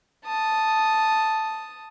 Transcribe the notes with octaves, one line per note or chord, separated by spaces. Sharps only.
A5 D#6